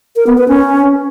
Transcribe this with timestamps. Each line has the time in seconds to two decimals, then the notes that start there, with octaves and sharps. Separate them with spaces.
0.16 A#4
0.27 B3
0.38 B4
0.48 C#4